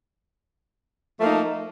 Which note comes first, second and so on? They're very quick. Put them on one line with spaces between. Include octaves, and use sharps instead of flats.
F3 A3 A#3 D#4